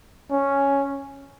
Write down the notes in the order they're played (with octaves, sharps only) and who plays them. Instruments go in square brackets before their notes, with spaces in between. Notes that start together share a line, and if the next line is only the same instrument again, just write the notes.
[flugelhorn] C#4